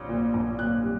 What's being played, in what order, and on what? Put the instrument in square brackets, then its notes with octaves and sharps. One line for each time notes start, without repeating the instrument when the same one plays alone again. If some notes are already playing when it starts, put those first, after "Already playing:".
Already playing: [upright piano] A#1
A#2
A#1
A#2 F#6
G3